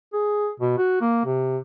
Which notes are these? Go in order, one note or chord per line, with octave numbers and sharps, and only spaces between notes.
G#4
B2
F#4
A#3
C3